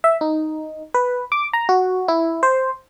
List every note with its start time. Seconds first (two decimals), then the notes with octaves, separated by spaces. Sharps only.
0.04 E5
0.21 D#4
0.94 B4
1.32 D6
1.53 A#5
1.69 F#4
2.08 E4
2.43 C5